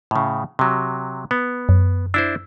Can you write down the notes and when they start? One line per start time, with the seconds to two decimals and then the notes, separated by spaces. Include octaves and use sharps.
0.11 A2 C#3
0.59 C3 F#3
1.31 B3
1.69 F#2
2.14 D4 E4 C5 E6